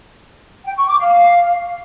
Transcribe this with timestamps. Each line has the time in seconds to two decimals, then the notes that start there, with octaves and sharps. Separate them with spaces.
0.66 G5
0.77 C#6
0.88 D6
0.99 F5